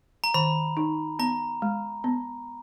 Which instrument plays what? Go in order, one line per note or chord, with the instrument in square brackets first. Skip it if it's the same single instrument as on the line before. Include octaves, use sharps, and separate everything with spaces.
[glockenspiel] A#5
[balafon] D#3 [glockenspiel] B5
[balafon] D#4
[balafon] B3 [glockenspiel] A#5
[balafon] G#3
B3